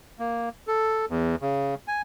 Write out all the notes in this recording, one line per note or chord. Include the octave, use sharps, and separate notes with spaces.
A#3
A4
E2
C#3
G#5